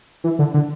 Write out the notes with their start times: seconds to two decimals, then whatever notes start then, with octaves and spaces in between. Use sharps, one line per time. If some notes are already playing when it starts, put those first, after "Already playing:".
0.24 E3
0.39 D3
0.54 D3